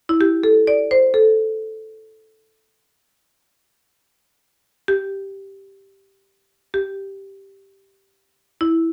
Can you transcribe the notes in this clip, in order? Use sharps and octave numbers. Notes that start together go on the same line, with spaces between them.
E4
G4
A4
D5
C5
A4
G4
G4
E4